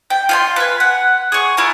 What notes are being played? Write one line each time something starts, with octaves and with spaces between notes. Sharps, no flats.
G5
F4 G#5 C6
B4 G#5
F#5
G#4 C#6
E4 F4 A#5